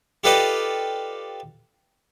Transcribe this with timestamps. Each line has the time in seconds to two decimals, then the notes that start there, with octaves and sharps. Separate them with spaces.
0.24 F4 G4 A4 B4 D5 D#5